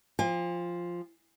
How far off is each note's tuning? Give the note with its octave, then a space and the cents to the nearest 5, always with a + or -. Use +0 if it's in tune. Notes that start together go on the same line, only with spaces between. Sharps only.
F3 +0 G#5 -45